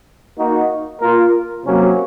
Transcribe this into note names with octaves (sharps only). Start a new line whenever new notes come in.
A#3 D#4 F#4 A#4
A#3 F4 A#4
C3 F#3 A#3 C#4